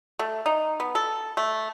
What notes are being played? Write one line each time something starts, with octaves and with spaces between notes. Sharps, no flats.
A3
D#4
B3
A4
A3